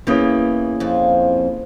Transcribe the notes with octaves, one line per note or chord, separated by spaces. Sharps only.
E2 E3 A#3 C#4 E4 G#4 C#5
F2 F3